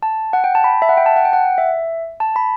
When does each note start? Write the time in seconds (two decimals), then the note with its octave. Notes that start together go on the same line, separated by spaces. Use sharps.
0.03 A5
0.33 F#5
0.44 G5
0.55 A5
0.64 B5
0.82 E5
0.89 F#5
0.97 G5
1.06 A5
1.16 F#5
1.25 G5
1.33 F#5
1.58 E5
2.20 A5
2.36 B5